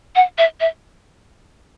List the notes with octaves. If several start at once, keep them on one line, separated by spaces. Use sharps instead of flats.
F#5
E5
E5